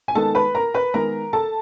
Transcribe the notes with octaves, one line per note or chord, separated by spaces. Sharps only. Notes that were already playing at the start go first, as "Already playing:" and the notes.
G#5
D#3 G#3 B3 A4 A5
B4 B5
A#4 A#5
B4 B5
D#3 G#3 B3 A#4 A#5
A4 A5